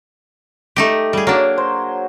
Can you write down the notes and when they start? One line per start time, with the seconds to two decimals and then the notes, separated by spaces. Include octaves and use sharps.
0.76 A3 D#4 G4
1.13 G3 G#4
1.27 F#3 A#3 D4
1.58 C5